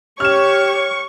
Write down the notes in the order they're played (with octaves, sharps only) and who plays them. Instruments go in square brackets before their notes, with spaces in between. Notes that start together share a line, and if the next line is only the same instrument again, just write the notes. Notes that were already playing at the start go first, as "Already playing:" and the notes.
[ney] G4 [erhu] C#5 [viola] C#6 [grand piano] F6 E7